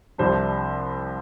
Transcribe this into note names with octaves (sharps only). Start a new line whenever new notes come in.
C2 C3 F3 D4 C5